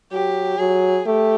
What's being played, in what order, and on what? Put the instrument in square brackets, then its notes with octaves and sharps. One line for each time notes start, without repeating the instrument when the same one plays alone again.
[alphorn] F#3 [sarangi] G4
[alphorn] F#3 [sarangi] G#4
[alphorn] A3 [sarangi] G4